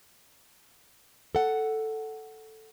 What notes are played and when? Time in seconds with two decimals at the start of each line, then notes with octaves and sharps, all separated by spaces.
1.35 A4 F#5